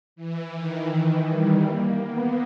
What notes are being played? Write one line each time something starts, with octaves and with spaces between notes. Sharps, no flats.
E3
D#3
G3
A#3
B3